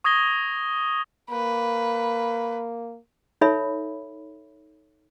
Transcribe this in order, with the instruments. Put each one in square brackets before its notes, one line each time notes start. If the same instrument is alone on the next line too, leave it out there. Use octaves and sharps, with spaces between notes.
[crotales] C#6 D#6 G#6 A#6 G7
[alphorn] A#3 [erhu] B4
[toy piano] D#4 A4 C#5 E5 B5